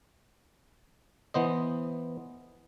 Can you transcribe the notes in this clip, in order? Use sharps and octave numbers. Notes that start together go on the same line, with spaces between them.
E3 B3 C5 D#5